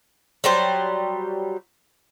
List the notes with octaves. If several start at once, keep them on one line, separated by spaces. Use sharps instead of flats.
F#3 G3 C5